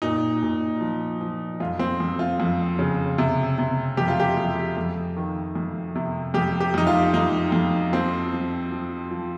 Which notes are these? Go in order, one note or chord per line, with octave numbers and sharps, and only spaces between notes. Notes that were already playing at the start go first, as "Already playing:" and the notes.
A#2 D#4
A#2
F3
F3
F2 F4
C4
F2
F4
F2
C#3
C3
C3
F2 G4
F4
G4
F2
F2
D#3
F2
C3
F2 G4
G4
F2 D#4
F4
F2 D#4
F2
F3 C4
F3
F3
F3